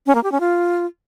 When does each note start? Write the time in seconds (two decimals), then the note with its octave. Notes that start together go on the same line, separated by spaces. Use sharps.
0.07 C#4
0.15 A#3
0.23 G4
0.32 C#4
0.40 F4